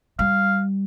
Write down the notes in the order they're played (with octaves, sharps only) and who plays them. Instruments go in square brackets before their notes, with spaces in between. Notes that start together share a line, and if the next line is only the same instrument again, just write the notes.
[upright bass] G3 [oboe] F5